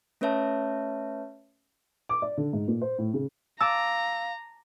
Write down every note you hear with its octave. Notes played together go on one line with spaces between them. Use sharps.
A3 C#4 B4 C#5 E5 A5
D6
D5
D3
G#2
A#2
C5
A2
C#3
F5 A5 A#5 D6 E6